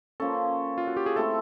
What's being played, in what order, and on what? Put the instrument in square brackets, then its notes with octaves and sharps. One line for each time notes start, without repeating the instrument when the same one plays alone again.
[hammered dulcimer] F3 A#3 C#4 [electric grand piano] A4
[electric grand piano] F4
F#4
G4
G#4
[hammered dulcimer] A3 C4 E4 [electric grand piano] A4